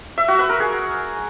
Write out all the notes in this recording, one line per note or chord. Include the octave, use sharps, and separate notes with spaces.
E5
F#4
B4
A#4
G#4